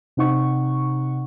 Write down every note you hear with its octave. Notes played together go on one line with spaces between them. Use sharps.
C3 C4 D#4 F#5 C#6